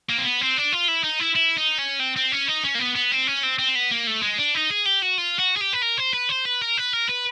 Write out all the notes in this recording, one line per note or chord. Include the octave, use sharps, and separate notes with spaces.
A#3
C4
B3
C4
D4
F4
E4
D#4
E4
E4
D#4
C#4
C4
C4
C#4
D#4
C#4
A#3
B3
B3
C4
C#4
C4
C4
B3
A#3
A3
G#3
D4
D#4
G#4
G4
F#4
F4
F#4
G#4
G4
B4
A#4
C5
B4
C5
B4
A#4
B4
A#4
B4